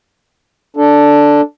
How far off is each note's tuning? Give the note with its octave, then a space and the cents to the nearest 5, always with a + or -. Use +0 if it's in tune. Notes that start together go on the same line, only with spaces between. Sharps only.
D4 +0 A4 +0